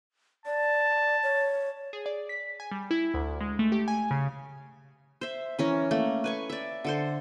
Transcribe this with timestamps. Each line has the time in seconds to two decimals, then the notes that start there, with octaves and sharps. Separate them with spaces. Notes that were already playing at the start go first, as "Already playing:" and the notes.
0.46 D5 A5
1.23 C#5
1.93 G#4
2.06 D5
2.29 B6
2.60 G#5
2.71 G3
2.91 E4
3.14 D2
3.41 G#3
3.59 A3
3.72 G4
3.88 G#5
4.11 C#3
5.21 C5 E5
5.59 E3 C#4 A#4
5.91 A3 A#3
6.24 B4 G#5 C#6
6.50 D5 E5
6.85 D3 A4 C5